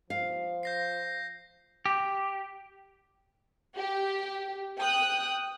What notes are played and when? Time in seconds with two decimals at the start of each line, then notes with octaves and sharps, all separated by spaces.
0.10 F3 F5
0.63 G6 A#6 C7
1.86 G4
3.77 G4
4.78 G5 D#6 F#6